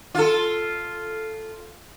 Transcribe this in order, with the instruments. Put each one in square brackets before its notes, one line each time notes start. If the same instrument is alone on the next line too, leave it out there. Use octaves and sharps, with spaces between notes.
[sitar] F4 A4